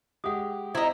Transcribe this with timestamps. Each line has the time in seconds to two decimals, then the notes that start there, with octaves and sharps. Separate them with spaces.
0.24 G#3 G4 F#5 D#6
0.75 C4 E4 D#5 E5 A#5